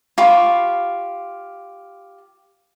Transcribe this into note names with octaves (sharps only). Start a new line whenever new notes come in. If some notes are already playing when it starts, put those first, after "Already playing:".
F4 G4 B5 C#6